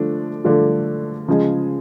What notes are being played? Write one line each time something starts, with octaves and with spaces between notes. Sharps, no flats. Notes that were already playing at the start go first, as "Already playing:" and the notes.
Already playing: D3 F3 A3 D4
D3 F3 A3 D4 F4
C#3 F3 G#3